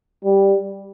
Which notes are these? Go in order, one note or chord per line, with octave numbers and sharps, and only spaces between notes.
G3